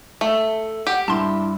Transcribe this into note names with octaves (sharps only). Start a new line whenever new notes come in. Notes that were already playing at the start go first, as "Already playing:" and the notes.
A3 E5
G4 F#5
G2 E4 A5 C6